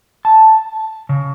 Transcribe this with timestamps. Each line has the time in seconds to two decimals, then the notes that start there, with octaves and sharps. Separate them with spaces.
0.25 A5
1.09 C#3